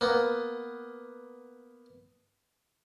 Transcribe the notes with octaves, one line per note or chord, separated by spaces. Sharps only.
A#3 B3